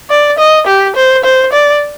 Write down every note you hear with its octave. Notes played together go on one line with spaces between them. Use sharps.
D5
D#5
G4
C5
C5
D5